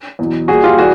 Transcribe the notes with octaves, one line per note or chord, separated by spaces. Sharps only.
E2 B2 F#3
A#2 G3 F#4 G#4
F4 G4
E3 G3 F#4 G#4